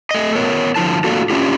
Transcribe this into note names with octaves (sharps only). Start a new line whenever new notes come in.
A3 D#5
B3 A#4 C#5
D3 F3 E4 A5
A3 A#3 D4 F4 F#4 A4
C#4 D4 E4 F4 G4